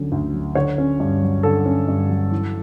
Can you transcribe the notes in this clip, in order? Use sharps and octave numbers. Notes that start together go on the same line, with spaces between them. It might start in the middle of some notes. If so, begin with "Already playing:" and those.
Already playing: D2 D3 F#3 C#4
D2
F#3
D3 C#5
C#4
G2
F#3
D3 A4
C#4
G2
F#3
E3